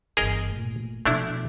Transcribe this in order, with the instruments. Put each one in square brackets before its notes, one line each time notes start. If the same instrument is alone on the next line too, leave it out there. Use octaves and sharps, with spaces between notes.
[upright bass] G1 E3 [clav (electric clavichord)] G#4 A#4 D#5
[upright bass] A#2 A3
[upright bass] B2 F3 [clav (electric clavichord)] A3 D4 E4